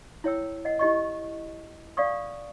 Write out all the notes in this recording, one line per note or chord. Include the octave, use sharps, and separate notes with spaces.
E4 C#5 G5 E6
D#5 F#5
E4 G4 D#5 C#6
D5 F5 F#5 C#6 D#6